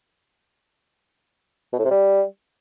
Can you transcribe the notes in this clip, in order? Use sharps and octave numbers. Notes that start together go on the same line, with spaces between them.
B2
A2
C3
G3